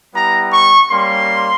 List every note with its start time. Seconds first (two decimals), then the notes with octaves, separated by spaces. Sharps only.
0.14 G3 B3 E4 G4 A#5
0.53 C#6
0.91 G3 A#3 C#4 C6